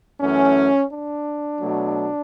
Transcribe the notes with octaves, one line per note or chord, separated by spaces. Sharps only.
F#2 E3 A3 C#4
D4
B2 F#3 A3